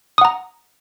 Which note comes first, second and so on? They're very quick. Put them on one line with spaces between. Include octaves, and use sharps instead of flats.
D#6 F#5 A#5